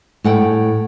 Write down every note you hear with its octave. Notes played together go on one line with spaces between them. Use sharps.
A2 F#5 G5